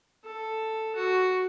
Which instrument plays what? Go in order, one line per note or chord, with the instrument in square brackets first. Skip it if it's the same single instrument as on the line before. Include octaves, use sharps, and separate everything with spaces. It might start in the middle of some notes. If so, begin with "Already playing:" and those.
[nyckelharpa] A4
F#4